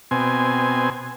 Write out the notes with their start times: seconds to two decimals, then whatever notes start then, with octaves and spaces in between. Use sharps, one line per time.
0.11 B2 C4 G#5